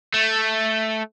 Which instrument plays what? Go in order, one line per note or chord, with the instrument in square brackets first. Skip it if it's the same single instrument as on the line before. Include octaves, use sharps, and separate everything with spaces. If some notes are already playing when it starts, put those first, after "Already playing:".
[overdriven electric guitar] A3